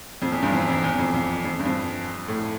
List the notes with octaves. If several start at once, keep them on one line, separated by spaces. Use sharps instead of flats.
F2
E2
E2 G2
F2
F2
E2
F2
F2
F2
G2
F2
A2